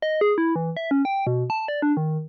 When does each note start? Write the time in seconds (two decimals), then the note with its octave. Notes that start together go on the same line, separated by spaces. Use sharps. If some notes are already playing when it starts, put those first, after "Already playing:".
0.02 D#5
0.21 G#4
0.38 E4
0.56 E3
0.77 E5
0.91 C#4
1.05 G5
1.27 B2
1.50 A5
1.68 D5
1.82 D4
1.97 D#3